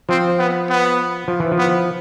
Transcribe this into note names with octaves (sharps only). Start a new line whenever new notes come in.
F3 C4
B3
B3
F3
E3
F3
B3